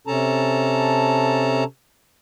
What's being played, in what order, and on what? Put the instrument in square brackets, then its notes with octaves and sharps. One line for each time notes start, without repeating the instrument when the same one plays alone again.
[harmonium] C3 C#4 A4 A5 A#5